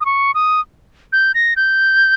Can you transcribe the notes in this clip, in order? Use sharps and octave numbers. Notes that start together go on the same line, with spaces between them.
D#6
C#6
D#6
G6
A#6
G6